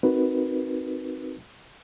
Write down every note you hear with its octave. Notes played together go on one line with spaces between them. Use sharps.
C4 D#4 F#4 A#4 B4